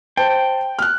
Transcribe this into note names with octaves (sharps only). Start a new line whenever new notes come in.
C5 G5 A5
F6 F#6